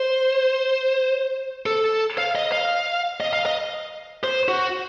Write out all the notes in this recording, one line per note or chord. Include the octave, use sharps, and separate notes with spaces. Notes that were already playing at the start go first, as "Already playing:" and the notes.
Already playing: C5
A4
F5
D#5
F5
D#5
F5
D#5
C5
F#4